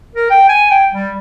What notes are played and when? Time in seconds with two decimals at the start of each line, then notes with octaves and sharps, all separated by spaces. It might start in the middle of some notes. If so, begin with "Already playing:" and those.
0.15 A#4
0.30 G5
0.49 G#5
0.71 G5
0.93 G3